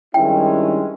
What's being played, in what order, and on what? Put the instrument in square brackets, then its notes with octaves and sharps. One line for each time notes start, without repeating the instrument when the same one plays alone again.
[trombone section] G2 D#3 G#3 C#4 E4 [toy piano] G5